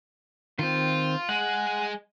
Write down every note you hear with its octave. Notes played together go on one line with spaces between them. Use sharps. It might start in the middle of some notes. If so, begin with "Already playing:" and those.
D#3 C4 F4
G#3 F#5